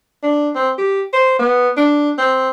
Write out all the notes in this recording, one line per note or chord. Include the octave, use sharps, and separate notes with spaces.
D4
C4
G4
C5
B3
D4
C4